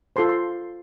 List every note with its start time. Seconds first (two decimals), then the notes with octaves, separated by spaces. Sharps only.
0.16 F4 A4 C5 C6
0.29 C6